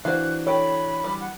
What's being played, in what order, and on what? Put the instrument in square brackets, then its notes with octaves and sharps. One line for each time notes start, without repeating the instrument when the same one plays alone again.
[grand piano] E3 D4 F#4 [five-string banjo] C5 F5 [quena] F#6
[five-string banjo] A4 G5 [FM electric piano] C#5 [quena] B5
[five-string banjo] G3
[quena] F#5